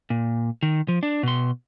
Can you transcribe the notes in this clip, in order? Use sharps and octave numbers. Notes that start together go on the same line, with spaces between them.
A#2
D#3
F3
D4
B2 C6